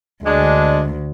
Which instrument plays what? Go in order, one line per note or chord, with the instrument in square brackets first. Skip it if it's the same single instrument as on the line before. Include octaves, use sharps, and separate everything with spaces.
[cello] D2 [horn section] G#3 D4